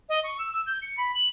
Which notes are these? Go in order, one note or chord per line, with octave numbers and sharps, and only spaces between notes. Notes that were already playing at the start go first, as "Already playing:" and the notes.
D#5
C#6
E6
E6
G6
C#7
B5
F#7